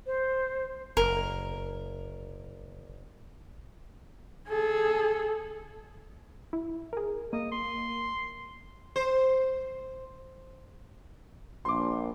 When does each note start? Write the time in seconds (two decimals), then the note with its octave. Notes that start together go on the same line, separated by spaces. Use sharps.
0.06 C5
0.97 F#1 A#4
4.49 G#4 A4
6.53 E4
6.93 G#4 A#4
7.33 A#3 D#5
7.52 C6
8.96 C5
11.65 A#1 C6 D6